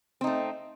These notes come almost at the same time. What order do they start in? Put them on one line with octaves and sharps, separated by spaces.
C4 D#4 A3